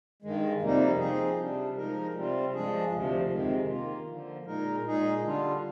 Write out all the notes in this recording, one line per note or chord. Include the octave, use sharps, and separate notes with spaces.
G2 D#3 G#3
F2 C3 G3 A#3 D#4
F3 C4 D#4 G#4
C3 G3 D4
F3 G#3 D#4 A#4
C3 G3 C4 F4
G2 F3 G#3 D4 G#4
D2 C3 F3
F2 C3 D#3 G#3
D#3 A#3 F4
D3 F3 A#3
A#2 G#3 D#4 A#4
A#2 G#3 D#4 G#4
D3 G3 D4 F4